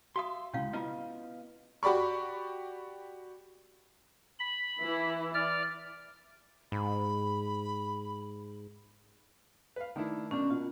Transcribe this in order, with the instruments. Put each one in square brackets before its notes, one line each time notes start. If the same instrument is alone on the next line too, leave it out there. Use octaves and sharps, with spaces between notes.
[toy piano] F#4 D#6 [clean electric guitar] E5 F5 C6
[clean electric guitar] C#2 B2 [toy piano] C#4 E4 F5
[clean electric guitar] B3 D#5 F5 [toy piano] E4 F4
[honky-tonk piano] F#4 G4 D5 B5 C#6
[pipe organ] B5
[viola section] E3 E4
[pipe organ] D5 F6
[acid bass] G#2 [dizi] B5
[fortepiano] B4 F5
[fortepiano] D#3 D4 E4 [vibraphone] A3
[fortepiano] B2 D4 A#4 [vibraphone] C#4
[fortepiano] B2 [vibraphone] F4